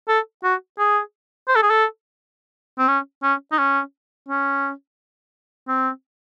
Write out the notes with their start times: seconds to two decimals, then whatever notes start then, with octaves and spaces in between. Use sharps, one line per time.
0.08 A4
0.44 F#4
0.78 G#4
1.48 C5
1.56 A4
1.63 G#4
1.70 A4
2.78 C4
2.88 C#4
3.23 C#4
3.52 D#4
3.58 C#4
4.28 C#4
5.68 C4